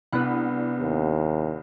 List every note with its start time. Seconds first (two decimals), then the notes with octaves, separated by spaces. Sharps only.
0.12 C2 B3 D4 F#5 B5
0.81 D#2